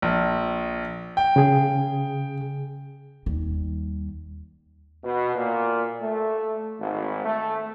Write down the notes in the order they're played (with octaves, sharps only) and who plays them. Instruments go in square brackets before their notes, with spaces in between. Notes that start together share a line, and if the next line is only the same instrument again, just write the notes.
[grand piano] A#1
G5
[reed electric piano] C#3 G#4
[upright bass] D#2 G3
[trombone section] B2
A#2
A3
G#1
A3